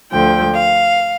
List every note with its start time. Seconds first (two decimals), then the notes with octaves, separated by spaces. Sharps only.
0.12 D2 D3 F3 G5
0.54 F5